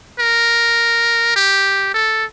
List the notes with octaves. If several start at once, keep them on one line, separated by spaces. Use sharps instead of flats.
A#4
G4
A4